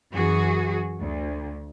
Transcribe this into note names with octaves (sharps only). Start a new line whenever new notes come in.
F#2 E3 F#4 G#4
D2